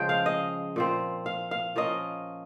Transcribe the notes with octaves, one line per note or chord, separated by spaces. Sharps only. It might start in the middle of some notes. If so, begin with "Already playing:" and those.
Already playing: C#3 F3 G#3 G5
F5
D#5
A#2 F3 C4
F5
F5
F3 A#3 C#4 D#5